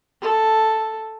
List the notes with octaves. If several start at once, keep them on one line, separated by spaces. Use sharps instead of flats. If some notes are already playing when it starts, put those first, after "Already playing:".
A4